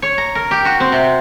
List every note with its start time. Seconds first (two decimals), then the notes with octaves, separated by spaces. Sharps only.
0.02 C#5
0.18 A#5
0.35 A#4
0.51 G4
0.65 F#4
0.80 C4
0.92 C3